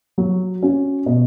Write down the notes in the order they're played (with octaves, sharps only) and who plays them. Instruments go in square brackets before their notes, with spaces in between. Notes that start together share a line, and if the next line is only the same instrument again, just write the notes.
[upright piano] F#3
C#4 F#4
B2